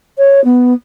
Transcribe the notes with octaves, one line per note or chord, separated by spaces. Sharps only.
C#5
B3